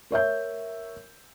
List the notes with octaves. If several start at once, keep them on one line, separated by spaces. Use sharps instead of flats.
A#4 C#5 E5 G6